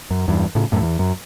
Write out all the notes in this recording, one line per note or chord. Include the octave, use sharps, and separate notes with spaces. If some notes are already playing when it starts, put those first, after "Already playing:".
F#2
E2 G2
A2 C#3
F#2 A2
E2
F#2